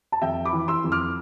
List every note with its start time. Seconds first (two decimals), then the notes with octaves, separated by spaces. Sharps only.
0.12 A5
0.22 F2 E5 G5
0.45 B5 D6
0.53 E3
0.68 C6 E6
0.84 F2
0.92 D6 F6